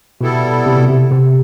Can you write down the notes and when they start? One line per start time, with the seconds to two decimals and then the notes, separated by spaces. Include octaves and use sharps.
0.21 B2 G3 B3 E4 A4
0.66 C3
0.77 B2
0.89 C3
1.11 C3